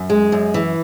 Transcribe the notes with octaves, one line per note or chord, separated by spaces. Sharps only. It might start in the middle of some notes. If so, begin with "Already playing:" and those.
Already playing: F#2
G#3
F#2
E3